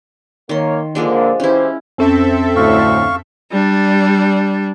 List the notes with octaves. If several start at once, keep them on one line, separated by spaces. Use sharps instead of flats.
D#3 A#3 C#5 C6
D3 F3 G#3 A#3 D4
E3 C#4 E4 G4 C5
F2 C4 C#4 A4 E5
D2 A2 F5 C#6
G3 D4